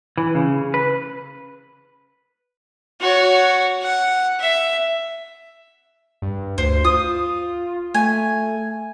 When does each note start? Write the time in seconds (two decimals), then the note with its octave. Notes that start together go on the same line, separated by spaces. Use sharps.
0.17 E3
0.35 C#3
0.74 B4
3.01 F#4 C#5
3.82 F#5
4.40 E5
6.22 G2
6.58 D2 C5
6.85 F4 D#6
7.94 A3 G#5